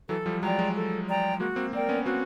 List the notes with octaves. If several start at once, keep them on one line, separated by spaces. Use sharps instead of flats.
E3 F#3 A4
F3 G3
F#3 G#3 D5 G5 A#5
F#3 G#3
A4
D5 G5 A#5
G#3 A#3 F#4
A#3 C4
A#3 C4 A#4 D5 G5
B3 C#4
A#3 C4 F#4